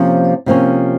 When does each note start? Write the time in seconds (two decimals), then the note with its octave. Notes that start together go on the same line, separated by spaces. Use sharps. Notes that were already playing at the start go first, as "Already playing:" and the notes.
Already playing: C3 F3 A#3 C#4
0.46 C3 F3 A#3 C#4